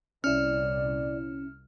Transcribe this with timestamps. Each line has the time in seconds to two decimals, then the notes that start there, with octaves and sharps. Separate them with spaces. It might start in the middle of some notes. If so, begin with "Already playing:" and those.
0.24 C2 A#2 C#4 E4 D5 F6